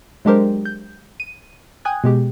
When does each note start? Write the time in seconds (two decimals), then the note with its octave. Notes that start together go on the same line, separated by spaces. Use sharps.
0.25 F#3 G#3 D4 G4 A#4 C5
0.65 G6
1.20 D#7
1.85 G5 G#5 D#6 F#6 G#6
2.04 B2 G#3 G4